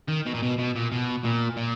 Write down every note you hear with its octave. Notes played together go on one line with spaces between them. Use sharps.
D#3
B2
A#2
B2
B2
A#2
B2
A#2
A#2